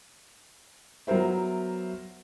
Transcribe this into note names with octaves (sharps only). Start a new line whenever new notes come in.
F#3 B3 A#4 C5 E5